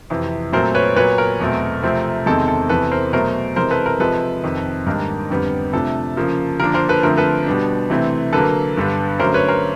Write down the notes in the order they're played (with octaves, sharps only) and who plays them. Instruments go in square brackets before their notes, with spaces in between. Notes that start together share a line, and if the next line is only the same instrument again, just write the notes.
[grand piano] F2 C3 E3
A#2 F#3 A3 C4 A#4 C5
B4 C#5
A#2 F#3 B3 B4 C#5
A#4
E2 B2 F#3 A3 C4
C3 F3 A3 C4
E2 C3 D#3 G#3 C4 A4
A4
E2 C3 E3 A4 B4
A#4 C5
B2 F#3 A3 A#4 C5
C3 E3 G#3 A#4 C5
A4 B4
A#4
C3 F3 G#3 A4 B4
F2 C3 D#3
G#2 D#3 G3 A#3 D4 A#4
F2 D3 G3 B3
C3 F3 A3 D4 A4
C#3 F3 A#3
D3 F3 A#3 D4 A#4
A#4 C5
A4 B4
D3 F3 A3 C4 A#4
A4 B4
B2 G3 B3 D4
C3 E3 A3 C4
D3 F#3 A#3 A4 B4
G2 D3 G3 B3 D4
D3 F#3 A3 C#4 A#4 C5
B4 C#5
A#4 C5